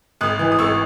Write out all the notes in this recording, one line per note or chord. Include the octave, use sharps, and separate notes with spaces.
G#1 D#6 F#6
E3
D#6
G#1 C#6 E6